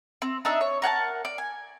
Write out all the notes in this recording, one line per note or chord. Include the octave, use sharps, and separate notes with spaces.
C4
D4 D#4 E5
C#5
A#4 F#5 G#5 A5
D5
G#5